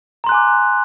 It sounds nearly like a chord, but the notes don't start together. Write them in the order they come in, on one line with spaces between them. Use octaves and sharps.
A#5 C6 F#6 G#5 D6